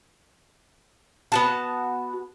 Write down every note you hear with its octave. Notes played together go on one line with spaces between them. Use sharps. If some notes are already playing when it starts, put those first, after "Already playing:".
B3 F#4 A5